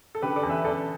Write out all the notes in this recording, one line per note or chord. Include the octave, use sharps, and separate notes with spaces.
A4
D3 G4 B4
A4 D5
E2
B4 E5
E2 A4 D5